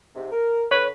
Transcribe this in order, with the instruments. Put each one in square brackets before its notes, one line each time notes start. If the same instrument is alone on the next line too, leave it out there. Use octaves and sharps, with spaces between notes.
[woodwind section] G#2 C3
A#4
[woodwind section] D3 [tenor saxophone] B4 [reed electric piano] C#5